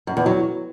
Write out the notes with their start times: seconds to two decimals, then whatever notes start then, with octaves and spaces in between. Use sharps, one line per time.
0.07 F#2
0.17 E2
0.26 F#3